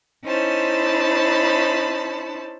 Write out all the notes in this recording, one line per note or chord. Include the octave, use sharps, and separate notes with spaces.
C#4 D#4 E4 C5 A5 B5